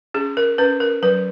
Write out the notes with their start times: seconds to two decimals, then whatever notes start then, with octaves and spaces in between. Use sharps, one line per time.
0.14 C#4 G#4
0.37 A#4
0.58 C#4 B4
0.80 A#4
1.02 F#3 B4